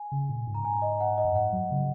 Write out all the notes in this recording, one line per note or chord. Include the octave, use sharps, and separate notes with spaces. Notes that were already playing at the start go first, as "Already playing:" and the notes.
Already playing: G#5
C#3
A#2
G#2
A#5
G#5
D#5
F#5
D#5
F#2
G#2 F#5
F#3
C#3